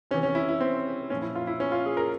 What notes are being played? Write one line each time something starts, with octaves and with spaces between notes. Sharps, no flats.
C3 E3 C#4
C#4
E4
E4
C4
A#2 F3 C#4
E4
F4
E4
C#4
F4
G#4
A#4